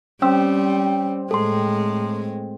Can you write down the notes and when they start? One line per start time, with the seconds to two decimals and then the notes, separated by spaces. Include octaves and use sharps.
0.22 G3 C4 C#4 E6
1.31 A2 G#3 A4 C6